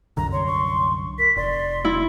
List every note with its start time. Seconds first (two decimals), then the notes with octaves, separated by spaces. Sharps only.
0.17 C2 F#2 D3 A#5
0.32 C#5 C6
0.47 C#6
1.18 A#4 B6
1.36 F1 D5 C6
1.85 E4